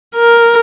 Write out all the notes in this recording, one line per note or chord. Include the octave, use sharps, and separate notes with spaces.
A#4